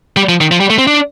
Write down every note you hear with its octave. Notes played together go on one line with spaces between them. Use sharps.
G3
F3
D#3
F3
G3
A3
C4
D4